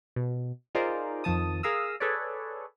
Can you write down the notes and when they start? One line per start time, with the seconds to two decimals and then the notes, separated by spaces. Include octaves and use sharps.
0.16 B2
0.75 D#4 F4 G#4 A#4 C5 D5
1.24 F2 D#3 F3 A5 D#6
1.63 G#4 A#4 F5 A#5 D#6 E6
2.00 G#4 A4 B4 C#5 D5